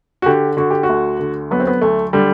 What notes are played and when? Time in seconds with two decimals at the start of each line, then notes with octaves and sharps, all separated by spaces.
0.22 F#4
0.26 D3 G4
0.57 D3 F#4
0.70 G4
0.83 F#4
0.89 D2
1.19 D3
1.51 F#3 B3
1.60 C4
1.67 B3
1.81 D2 A3
2.13 D3 G3